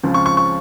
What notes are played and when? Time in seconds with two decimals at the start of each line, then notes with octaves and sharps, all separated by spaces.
0.03 C#2 C#3 F3 C4
0.14 C#6
0.26 C#6
0.37 C#6